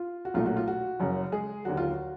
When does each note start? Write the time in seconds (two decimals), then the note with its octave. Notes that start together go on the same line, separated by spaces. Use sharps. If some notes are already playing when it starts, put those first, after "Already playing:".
Already playing: F4
0.25 F#4
0.34 B1 A#2 F#3 A3 F4
0.46 F#4
0.57 F4
0.68 F#4
1.00 F#1 F#2 C#3
1.32 G#3 G#4
1.65 D#2 D3 F#3 F#4
1.77 F4
1.90 F#4